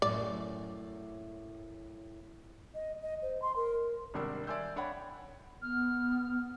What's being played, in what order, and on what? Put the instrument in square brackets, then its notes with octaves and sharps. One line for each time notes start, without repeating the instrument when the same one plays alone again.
[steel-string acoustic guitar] F#2 A2 [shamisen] D5
[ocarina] D#5
D#5
C5
C6
A#4
[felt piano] G#1 C3 G3 D4 A#4 E6
D5 E5 G#5 C6 E6 G6
D4 C#5 F#5 G5 B5
[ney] B3 [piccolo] F6